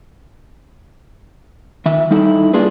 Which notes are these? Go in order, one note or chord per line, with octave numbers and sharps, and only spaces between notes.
D#3 E5
G3 D#4 E4 A4
A#3 D4 F4 G#4 B4